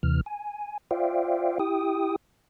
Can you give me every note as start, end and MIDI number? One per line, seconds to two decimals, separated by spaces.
0.03 0.21 39
0.03 0.21 48
0.03 0.21 52
0.03 0.21 89
0.26 0.78 80
0.91 1.58 65
0.91 1.58 72
0.91 1.58 74
0.91 1.58 76
0.91 1.58 77
0.91 1.58 79
1.59 2.16 64
1.59 2.16 67
1.59 2.16 79
1.59 2.16 87